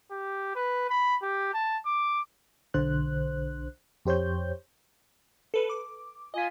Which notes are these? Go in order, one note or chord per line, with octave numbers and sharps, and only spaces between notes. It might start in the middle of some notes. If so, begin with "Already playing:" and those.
G4
B4
B5
G4
A5
D6
B1 D3 C5 F#6
F2 G4 C5 C#5 G6
A4 B4
D6
F4 D#5 G#5 B6